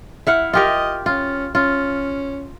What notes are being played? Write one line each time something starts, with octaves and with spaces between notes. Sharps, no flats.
E4 F5 F#5
F4 G4 A#4 D#5
C#4 F4
C#4 F4